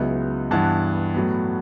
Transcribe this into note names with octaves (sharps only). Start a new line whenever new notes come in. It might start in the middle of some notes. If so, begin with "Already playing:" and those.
Already playing: C#2 C#3 F#3 B3 E4
G2 E3 B3 F#5 A5
A2 F#3 B3